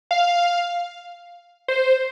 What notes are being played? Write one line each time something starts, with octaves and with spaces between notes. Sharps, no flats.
F5
C5